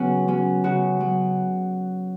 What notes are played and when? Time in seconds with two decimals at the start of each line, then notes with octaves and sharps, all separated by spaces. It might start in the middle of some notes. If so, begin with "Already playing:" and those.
Already playing: C#3 F#3 B3 C#4 F#4 G#4
0.28 F#3 C#4
0.64 C#3 F#4
1.00 F#3